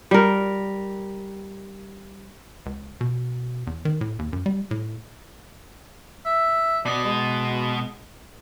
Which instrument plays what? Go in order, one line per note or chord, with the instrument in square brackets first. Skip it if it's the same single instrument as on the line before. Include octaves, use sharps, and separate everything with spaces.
[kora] G3 A#4
[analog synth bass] C#2
B2
E2
D#3
A2
D#2
F#2
G3
A2
[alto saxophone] E5
[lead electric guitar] B2 D#5 [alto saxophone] D5
[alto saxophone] G#3